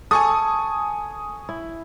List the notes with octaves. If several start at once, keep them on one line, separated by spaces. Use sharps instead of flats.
A4 G#5 C#6 D#6
E4